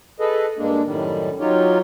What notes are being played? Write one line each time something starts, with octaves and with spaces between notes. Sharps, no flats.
G#4 A4 B4 D#5
G2 G#3 A#3 D4
F#2 A2 D#3 G3
F#3 D#4 F4 G4 C#5